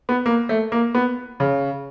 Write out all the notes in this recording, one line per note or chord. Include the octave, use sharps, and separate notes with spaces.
B3
A#3
A3
A#3
B3
C#3